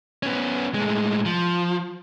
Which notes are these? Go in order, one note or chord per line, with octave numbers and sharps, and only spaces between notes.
B3 C#4
A2 G#3
F3